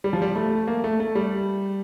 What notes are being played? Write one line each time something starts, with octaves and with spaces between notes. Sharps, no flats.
G3
F3
G3
A3
A#3
A3
A3
G3